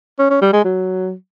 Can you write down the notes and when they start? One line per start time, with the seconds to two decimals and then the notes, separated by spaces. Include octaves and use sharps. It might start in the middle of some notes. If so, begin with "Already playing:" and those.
0.19 C#4
0.30 C#4
0.42 G3
0.53 G#3
0.64 F#3